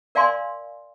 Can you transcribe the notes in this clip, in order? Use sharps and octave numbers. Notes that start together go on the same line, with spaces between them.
A#4 D5 F5 G#5 C6